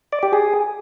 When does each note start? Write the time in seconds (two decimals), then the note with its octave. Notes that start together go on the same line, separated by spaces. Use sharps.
0.13 D5
0.23 G4
0.33 G#4